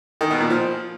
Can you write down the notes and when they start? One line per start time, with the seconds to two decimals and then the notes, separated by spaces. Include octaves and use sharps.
0.21 D#3
0.31 B2
0.40 A#2
0.50 F3